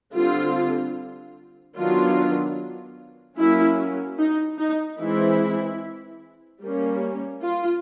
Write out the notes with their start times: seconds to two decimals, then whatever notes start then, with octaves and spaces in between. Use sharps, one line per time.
0.14 D3 G3 C4 F4
1.76 D#3 F#3 B3 D4 F4
3.38 F#3 A#3 C#4 E4
4.19 D#4
4.59 D#4
4.99 E3 G#3 C4 E4
6.61 G3 A#3 C#4
7.42 F4